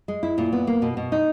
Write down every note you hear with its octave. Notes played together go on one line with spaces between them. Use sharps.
G#3
E4
A#2
B3
A#3
B2
B2
D#4